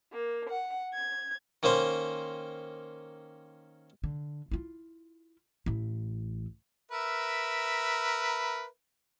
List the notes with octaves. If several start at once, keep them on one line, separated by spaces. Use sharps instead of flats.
A#3
F#5
G#6
D#3 A#3 C#4 C5
D3
E4 F4
A1 E4
A#4 B4 E5